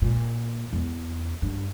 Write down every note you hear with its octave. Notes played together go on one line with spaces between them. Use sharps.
A#2
E2 B3
G2